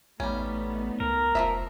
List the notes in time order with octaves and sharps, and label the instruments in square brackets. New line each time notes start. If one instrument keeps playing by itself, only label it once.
[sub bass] A1 [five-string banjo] G3 C#4 [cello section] A3 B3 D#4
[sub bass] C#2 [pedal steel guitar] A#4
[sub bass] F1 [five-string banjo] F3 D#4 E5